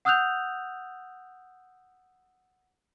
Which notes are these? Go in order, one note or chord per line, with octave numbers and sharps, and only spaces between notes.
F#5 D#6 E6 F#6 G6 F7